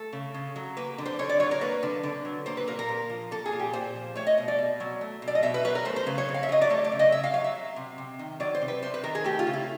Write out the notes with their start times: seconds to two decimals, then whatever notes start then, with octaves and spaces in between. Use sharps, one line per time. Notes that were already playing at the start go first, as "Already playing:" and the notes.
Already playing: A3 A4
0.13 C#3
0.34 C#3
0.56 F#3
0.77 A#3 B4
0.98 D3
1.06 C5
1.19 D3 C#5
1.29 D5
1.40 F#3 C#5
1.51 A#4
1.61 A#3 B4
1.83 D3
2.03 D3
2.25 F#3
2.46 A#3 C5
2.57 B4
2.67 A#2 A#4
2.79 A#4
2.89 A#2
3.10 F3
3.31 A#3 A4
3.46 G#4
3.52 A#2
3.60 G4
3.73 A#2 C5
3.95 F3
4.15 A3 C#5
4.27 D#5
4.38 B2
4.48 D5
4.59 B2
4.80 F#3
5.01 A3
5.22 B2
5.28 D5
5.35 D#5
5.43 B2 E5
5.54 B4
5.65 F#3 B4
5.75 A#4
5.85 A3 C5
5.96 C5
6.06 C#3 B4
6.18 C#5
6.29 C#3
6.34 F5
6.43 E5
6.49 F#3 D#5
6.62 D5
6.70 A3 C#5
6.85 D5
6.92 C#3
6.99 D#5
7.12 C#3 E5
7.24 F5
7.34 F#3 F5
7.44 E5
7.55 F#3
7.76 C3
7.98 C3
8.19 D#3
8.40 F#3 D5
8.55 C5
8.62 C3
8.68 B4
8.83 C3 C5
8.94 B4
9.03 D#3 A#4
9.15 G#4
9.24 A3 G4
9.39 F4
9.47 C#3
9.53 E4